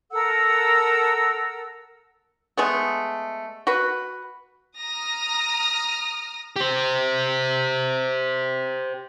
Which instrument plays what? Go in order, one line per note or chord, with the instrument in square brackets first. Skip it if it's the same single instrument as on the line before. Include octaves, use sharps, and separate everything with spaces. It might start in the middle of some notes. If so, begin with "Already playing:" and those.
[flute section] A4 A#4 F#5 E6
[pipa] G#3 A3 B3
F#4 B4
[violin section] A#5 D#6 F6 A#6
[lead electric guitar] G4 C5